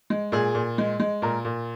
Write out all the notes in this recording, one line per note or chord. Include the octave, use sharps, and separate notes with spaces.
G#3
A#2 G#4
A#2
G#3
G#3
A#2 A#4
A#2